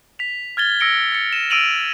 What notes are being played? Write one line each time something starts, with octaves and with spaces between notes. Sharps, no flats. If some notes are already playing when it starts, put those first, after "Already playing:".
B6 F7
F6 G#6 A6 G7
E6 A#6 C#7 D7 G7
A6 C#7
D#7 E7
E6 D7 D#7 F7 F#7